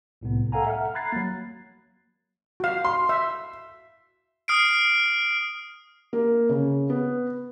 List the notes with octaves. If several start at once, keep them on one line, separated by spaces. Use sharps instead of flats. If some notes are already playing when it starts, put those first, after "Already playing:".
C2 A2 C3 B3
A4 F5 F#5 G#5 A#5
E5 F#5 F6
A#5 B5 F#6 G#6 A6 C7
F#3 A#3
F#4 F5
C6
E5
D#6 F6 C7 D7
A#3
C#3
B3